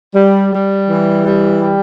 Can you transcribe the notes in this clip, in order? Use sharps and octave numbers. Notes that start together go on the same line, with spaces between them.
G3
G3
E3
G3
G3